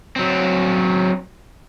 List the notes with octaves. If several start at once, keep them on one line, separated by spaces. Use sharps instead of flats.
F#3 C4